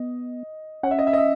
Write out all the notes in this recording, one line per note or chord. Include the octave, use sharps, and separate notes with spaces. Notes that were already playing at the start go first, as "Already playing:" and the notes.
Already playing: B3 D#5
C#4 F#5
E5
D#5
E5
D#5
E5